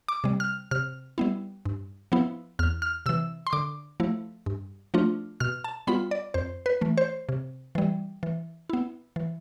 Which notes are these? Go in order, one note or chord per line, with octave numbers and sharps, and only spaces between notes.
D6
C3 G3
F6
C3 F6
G3 B3 E4
G2
F3 B3 E4
E2 F6
F6
C3 E3 E6
C6
D3 D6
F3 A3 E4
G2
F3 A3 D4 F4
B2 F6
A5
G3 B3 F4 B5
D5
F2 C5
B4
E3 A3
C5
C3
E3 G3
E3
B3 E4
E3